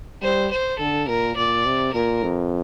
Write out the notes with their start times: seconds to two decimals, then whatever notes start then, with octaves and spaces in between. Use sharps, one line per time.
0.22 G3 C5
0.51 C5
0.79 D3 A4
1.08 A#2 A#4
1.37 A#2 D5
1.66 C3
1.94 A#2 A#4
2.23 F2